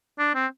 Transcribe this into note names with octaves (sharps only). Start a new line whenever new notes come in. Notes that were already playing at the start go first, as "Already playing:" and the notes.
D4
C4